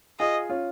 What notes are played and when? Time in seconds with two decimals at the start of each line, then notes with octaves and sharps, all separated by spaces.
0.19 F4 G#4 D#5
0.50 C#4 F4